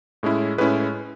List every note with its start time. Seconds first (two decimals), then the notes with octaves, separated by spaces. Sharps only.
0.23 A2 G#3 C#4 E4
0.58 A2 G#3 C#4 E4 B4